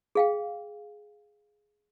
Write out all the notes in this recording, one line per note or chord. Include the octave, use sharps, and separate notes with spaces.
G#4 F5 G5